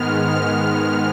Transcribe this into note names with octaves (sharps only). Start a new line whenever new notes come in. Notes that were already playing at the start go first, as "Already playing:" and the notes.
Already playing: G#2 D#3 G#3 B3 F6
F6